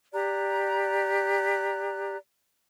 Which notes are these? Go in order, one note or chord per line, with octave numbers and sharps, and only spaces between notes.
G4 D5 A#5 F#6